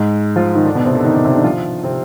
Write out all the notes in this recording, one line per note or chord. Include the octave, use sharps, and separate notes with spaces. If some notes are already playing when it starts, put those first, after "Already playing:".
Already playing: G#2 G#3
F3 F4
D#3 D#4
D3 D4
B2 B3
C3 C4
D3 D4
D#3 D#4
D3 D4
C3 C4
D3 D4
F3 F4
C3 C4